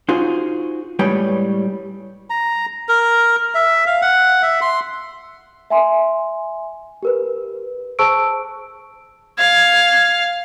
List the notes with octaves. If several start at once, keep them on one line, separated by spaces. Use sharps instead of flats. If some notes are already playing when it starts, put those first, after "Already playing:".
D#4 F4 F#4 G#4 C5
A2 G3 G#3 B4 C#5 G5
A#5
A#4
E5
F5
F#5
E5
C6
E5 G#5 C6
G4 A#4 B4
G#4 C5 A5 C#6 E6 D7
F5 G#6